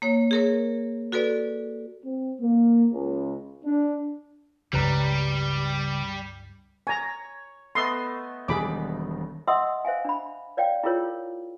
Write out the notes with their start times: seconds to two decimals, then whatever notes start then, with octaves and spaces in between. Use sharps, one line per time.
0.02 A#3 C#5
0.31 G#4 A#4 C#5
1.12 F#4 A4 B4 D5
2.05 C4
2.40 A#3
2.93 C#2
3.65 D4
4.73 C#2 G2 C#3 G3 B4 A#5
6.87 C#5 G#5 A#5
7.75 A3 B3 D#5 C6
8.48 E1 D#3 G3 G#4 B5 D6
9.47 D#5 E5 F#5 C6 D#6 E6
9.85 C5 E5 F5 G#5
10.05 D4 B5
10.57 C#5 D5 F5 G5
10.83 E4 F4 G#4 A#4 C#5